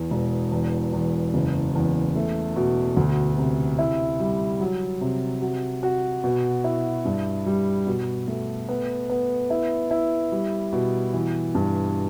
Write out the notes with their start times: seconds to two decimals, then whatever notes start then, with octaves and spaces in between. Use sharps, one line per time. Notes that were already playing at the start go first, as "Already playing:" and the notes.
Already playing: E2
0.11 E1
0.52 E2
0.93 E2
1.34 F#1
1.75 E2
2.15 A3
2.56 B2
2.97 D2
3.38 C3
3.79 E4
4.20 G3
4.60 F#3
5.01 C3
5.42 F#4
5.83 F#4
6.24 B2
6.64 E4
7.05 G2
7.46 G3
7.87 B2
8.28 A3
8.69 B3
9.10 B3
9.50 E4
9.91 E4
10.32 G3
10.73 B2
11.14 E3
11.55 G2